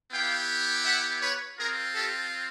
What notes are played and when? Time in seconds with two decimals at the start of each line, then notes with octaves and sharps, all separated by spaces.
0.12 B3 E4 G4 F5 G5
0.84 E5 F#5
1.20 B4 C#5
1.57 C4 F4 G#4 A#4
1.94 G4 A4